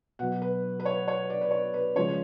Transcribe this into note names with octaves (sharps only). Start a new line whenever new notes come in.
B2 F#3 F#5
B4
B4
C#5
C#5
D5
B4
C#5
B4
C#3 F3 G#3 C#5